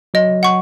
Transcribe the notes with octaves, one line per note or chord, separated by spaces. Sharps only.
F#3 D#5
F#5 C#6